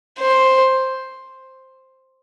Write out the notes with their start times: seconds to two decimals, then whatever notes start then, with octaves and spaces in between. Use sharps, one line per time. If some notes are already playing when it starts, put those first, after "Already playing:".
0.19 C5